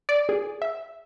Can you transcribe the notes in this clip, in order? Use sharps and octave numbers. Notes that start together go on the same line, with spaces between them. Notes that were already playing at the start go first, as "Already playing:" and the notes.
D5
G#4
E5